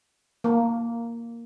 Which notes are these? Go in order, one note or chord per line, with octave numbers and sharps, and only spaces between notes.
A#3